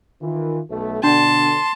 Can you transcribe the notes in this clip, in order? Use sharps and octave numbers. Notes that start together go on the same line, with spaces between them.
D#3 E3 F4
B1 A3
B2 D3 D4 A5 C6